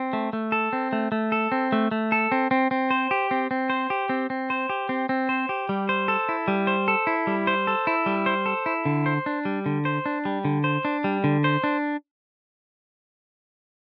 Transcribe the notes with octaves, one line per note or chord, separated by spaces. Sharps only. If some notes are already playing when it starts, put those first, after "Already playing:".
Already playing: C4
A3
A3
A4
C4
A3
A3
A4
C4
A3
A3
A4
C4
C4
C4
C5
G4
C4
C4
C5
G4
C4
C4
C5
G4
C4
C4
C5
G4
G3
C5
A4
E4
G3
C5
A4
E4
G3
C5
A4
E4
G3
C5
A4
E4
D3
C5
D4
G3
D3
C5
D4
G3
D3
C5
D4
G3
D3
C5
D4